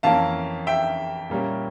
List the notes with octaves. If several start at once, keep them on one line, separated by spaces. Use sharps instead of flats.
F2 E3 A#3 C#4 F5 A5
E5 G5
A#2 G3 A#3 C#4